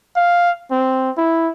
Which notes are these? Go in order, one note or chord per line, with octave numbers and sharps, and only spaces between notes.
F5
C4
E4